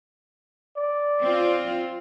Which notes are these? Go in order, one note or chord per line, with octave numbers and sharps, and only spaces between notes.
D5
C4 F4